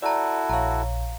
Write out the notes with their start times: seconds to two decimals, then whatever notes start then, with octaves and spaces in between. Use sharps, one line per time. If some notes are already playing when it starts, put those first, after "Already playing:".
0.02 E4 F#4 A4 D5 A#5
0.50 A#1 C#5 F5 A#5